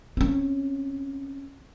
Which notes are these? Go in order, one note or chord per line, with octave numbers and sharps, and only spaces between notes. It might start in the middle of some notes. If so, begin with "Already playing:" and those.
C4 C#4